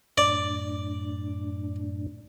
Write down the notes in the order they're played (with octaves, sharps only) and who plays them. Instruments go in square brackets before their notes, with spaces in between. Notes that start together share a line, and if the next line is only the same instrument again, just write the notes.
[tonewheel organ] F#2 A2 D4 [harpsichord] D5